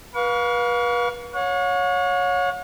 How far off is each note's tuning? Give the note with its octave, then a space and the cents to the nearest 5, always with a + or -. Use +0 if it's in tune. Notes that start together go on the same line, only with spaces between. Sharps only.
B4 -30 F5 +30 C#6 +40
C#5 +5 F#5 -45